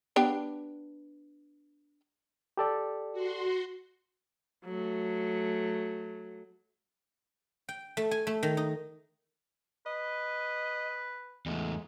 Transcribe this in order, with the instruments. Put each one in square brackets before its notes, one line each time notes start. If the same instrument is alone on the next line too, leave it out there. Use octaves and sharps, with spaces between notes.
[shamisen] B3 D4 G4
[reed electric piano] G4 A4 D5
[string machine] F#4 C6
[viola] F#3 A3
[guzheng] G5
A3
G#5
A3
D#3
D#4
[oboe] B4 [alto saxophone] D#5
[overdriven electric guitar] E2 A3 [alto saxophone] G#3